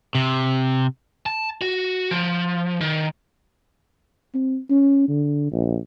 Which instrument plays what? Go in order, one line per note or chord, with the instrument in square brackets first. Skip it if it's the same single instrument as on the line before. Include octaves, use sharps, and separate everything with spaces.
[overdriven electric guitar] C3
[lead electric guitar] A5
F#4
F3
D#3
[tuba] C4
C#4
D3
A#1